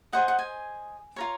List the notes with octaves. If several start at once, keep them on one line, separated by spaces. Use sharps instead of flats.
G#4 C5 D#5 F#5
F#5
G#5
F4 A#4 C#5